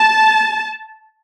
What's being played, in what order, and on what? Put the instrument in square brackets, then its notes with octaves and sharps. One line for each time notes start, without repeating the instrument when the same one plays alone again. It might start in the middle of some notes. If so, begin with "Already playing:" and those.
Already playing: [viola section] A5